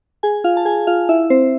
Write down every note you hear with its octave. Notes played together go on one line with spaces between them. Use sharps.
G#4 G#5
F4 F5
A5
G#4 G#5
F4 F5
E4 E5
C4 C5